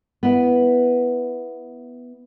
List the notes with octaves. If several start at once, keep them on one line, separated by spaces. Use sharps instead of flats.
B3 E4